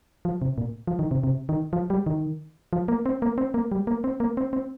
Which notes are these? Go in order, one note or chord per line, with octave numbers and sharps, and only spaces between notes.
F3
C3
A#2
F3
D#3
C3
C3
D#3
F3
G3
D#3
F3
A#3
C4
A#3
C4
A#3
G3
A#3
C4
A#3
C4
C4